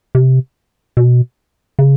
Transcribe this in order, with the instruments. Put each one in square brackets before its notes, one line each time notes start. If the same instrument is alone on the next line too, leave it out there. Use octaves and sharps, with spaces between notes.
[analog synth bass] C3
B2
C#3